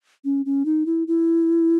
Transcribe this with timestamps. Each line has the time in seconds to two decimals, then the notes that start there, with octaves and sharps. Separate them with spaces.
0.25 C#4
0.46 C#4
0.65 D#4
0.86 E4
1.08 E4